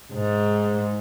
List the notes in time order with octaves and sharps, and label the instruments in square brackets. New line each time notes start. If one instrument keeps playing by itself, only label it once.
[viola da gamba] G#2